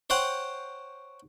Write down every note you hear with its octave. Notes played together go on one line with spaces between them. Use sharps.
C5 C#5 F#5 G5